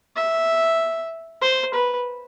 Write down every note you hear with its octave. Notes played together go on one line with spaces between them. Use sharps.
E5
C5
B4